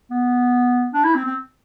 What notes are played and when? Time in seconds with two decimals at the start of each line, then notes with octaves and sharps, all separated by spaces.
0.11 B3
0.94 D4
1.04 E4
1.15 C4
1.25 C4